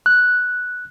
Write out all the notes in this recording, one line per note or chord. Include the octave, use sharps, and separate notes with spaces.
F#6